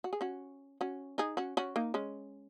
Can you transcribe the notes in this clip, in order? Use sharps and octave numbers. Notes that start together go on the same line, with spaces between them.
F#4
G#4
C#4 F#4
C#4 F#4
D#4 G#4
C#4 F#4
C#4 F#4
A#3 D#4
G#3 C#4